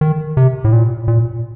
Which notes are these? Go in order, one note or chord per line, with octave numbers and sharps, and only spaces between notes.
D#3
C3
A2
A#2
A#2